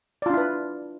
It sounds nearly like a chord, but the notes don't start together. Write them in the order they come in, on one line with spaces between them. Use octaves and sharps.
D5 F4 D4 E4 B4